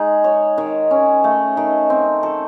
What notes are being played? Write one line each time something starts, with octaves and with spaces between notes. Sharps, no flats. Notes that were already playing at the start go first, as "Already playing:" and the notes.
Already playing: G#3 D#4 G#4
C#5
D#3
C#4
A3
D#3
C4
A4